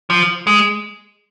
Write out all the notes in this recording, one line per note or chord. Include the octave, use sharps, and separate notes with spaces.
F3
G#3